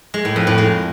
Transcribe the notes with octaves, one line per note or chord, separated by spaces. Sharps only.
G#3
A2
F2
A2
G#3